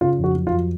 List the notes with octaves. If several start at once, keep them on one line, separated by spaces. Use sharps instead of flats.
C#3 F4
F2
F#4
F#3
F4
F2